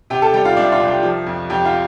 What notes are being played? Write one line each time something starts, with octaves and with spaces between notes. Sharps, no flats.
C3 G4 G5
A4 A5
G3 G4 G5
F4 F5
C2 D4 D5
F4 F5
C2
G4 G5
F3
F2
F2 G4 G5
F4 F5